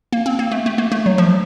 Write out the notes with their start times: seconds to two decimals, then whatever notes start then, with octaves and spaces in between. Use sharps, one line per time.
0.12 A#3
0.26 C4
0.39 A#3
0.52 A3
0.66 A3
0.78 A#3
0.92 A3
1.06 F#3
1.18 F3